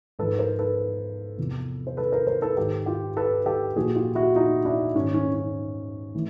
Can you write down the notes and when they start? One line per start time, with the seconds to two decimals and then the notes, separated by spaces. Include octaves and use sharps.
0.19 G#2 F3 A4 B4
0.39 A#4 C5
0.59 A4 B4
1.38 E2 C3 F3
1.87 C5
1.97 A4 B4
2.12 A#4 C5
2.27 A#4 C5
2.42 A4 B4
2.57 G#2 D#3 G4 A4
2.86 F4 G4
3.17 A4 B4
3.46 G4 A4
3.76 A#2 F3 F#4 G#4
3.95 F4 G4
4.15 E4 F#4
4.35 D#4 F4
4.65 D4 E4
4.95 G#2 D#3 C#4
5.14 C#4
5.35 C#4
6.14 A2 E3